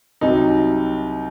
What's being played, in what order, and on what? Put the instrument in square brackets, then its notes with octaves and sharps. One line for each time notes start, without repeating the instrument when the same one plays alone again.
[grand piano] C2 C3 F#3 D#4